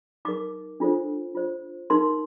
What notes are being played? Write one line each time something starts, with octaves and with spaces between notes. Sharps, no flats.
D#4 A#4 D6
D4 F4 A4 C5
F4 C5
D#4 A#4 C6